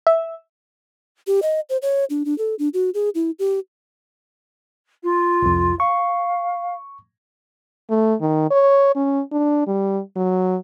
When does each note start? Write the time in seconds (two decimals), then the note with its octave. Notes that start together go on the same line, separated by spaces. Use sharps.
0.07 E5
1.27 G4
1.42 D#5
1.70 C5
1.82 C#5
2.10 D4
2.25 D4
2.38 A4
2.59 D4
2.74 F#4
2.94 G#4
3.15 E4
3.39 G4
5.04 F4
5.42 C2 F2
5.80 F5 C#6
7.90 A3
8.21 D#3
8.50 C#5
8.96 C#4
9.32 D4
9.67 G3
10.16 F#3